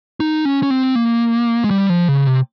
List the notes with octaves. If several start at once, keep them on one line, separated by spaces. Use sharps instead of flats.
D#4
C#4
C#4
C4
A#3
G#3
G3
F3
C#3
C3